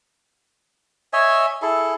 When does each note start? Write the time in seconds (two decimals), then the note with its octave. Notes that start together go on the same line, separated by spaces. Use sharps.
1.13 C#5 D#5 E5 G#5
1.62 E4 G#4 A4